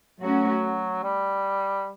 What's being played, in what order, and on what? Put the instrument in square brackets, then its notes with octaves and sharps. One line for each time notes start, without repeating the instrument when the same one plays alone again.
[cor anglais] F#3 [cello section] A3 C#4 F#4
[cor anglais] G3